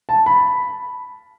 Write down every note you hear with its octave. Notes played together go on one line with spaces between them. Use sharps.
A5
B5